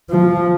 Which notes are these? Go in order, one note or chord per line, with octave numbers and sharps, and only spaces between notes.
F3